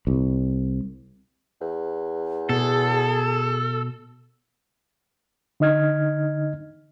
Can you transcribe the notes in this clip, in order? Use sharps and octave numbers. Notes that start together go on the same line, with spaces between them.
C2
E2
B2 G#4 A4
D3 D#4 D#5 F6 G#6